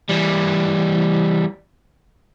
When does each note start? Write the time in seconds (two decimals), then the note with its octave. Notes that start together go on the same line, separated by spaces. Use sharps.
0.10 E3 G3